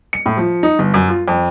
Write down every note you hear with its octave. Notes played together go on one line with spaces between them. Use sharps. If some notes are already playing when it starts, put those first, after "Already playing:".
C#7
A2
F3
D#4
G1
F#2
F4
F2